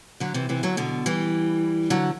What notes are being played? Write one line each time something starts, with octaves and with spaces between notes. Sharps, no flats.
D3 F#3
C3 E3
C3 E3
D3 F#3
B2 D3
E3 G3
D3 F#3